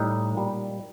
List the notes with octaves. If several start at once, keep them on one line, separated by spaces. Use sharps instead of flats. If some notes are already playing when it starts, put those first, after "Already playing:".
Already playing: A2 G3 D#4
A#2 G3